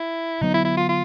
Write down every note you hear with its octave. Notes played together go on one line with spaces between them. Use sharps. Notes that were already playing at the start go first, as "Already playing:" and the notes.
Already playing: E4
D3 F#3 B3 D#4
E4
E4
F4
F4